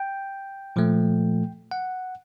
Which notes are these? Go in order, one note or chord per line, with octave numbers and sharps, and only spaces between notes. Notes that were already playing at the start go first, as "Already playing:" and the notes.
Already playing: G5
A#2 F3 A3
F#5